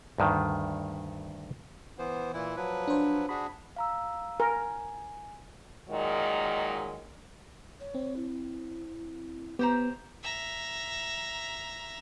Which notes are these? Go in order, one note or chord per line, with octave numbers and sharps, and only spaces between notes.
D2 G2 D#3
E3 B3 C5
A#2 E3 E4
F3 F#3 B4
D4 C5
D4 F#4 G#4 B5
F5 A#5 E6
A#4 G#5
A#2 D#3 F#3 G#3
C#5
C4
E4
B3 G4 C5 A#5
E5 A#5